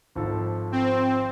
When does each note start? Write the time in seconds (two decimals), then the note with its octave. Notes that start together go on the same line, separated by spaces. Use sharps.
0.15 G#1 F3 A4
0.72 C4